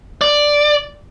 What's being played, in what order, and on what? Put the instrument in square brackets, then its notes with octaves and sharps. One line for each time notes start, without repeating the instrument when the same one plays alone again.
[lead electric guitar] D5